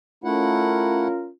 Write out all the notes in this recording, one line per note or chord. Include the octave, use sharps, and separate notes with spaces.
A3 C#4 E4 F4 A#4 F#5